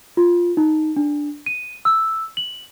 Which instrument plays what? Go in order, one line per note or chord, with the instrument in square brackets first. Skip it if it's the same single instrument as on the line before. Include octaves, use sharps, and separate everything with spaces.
[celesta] F4
D#4
D4
D#7
E6
F#7